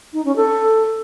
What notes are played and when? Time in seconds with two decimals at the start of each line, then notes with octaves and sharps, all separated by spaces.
0.14 D#4
0.25 C#4
0.36 A4